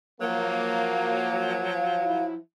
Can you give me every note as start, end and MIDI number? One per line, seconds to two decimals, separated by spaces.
0.20 2.39 53
0.20 2.39 54
0.20 1.83 58
1.72 2.26 77
2.04 2.36 64